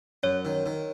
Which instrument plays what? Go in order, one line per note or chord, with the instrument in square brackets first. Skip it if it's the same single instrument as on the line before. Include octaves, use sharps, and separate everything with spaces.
[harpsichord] F#2 [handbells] C#5
[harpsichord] D#3
D#3